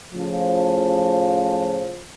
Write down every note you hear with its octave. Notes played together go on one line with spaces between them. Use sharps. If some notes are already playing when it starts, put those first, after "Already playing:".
A2 C#3 F3